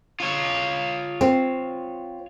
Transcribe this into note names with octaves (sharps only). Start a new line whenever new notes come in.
F4 C#5
C4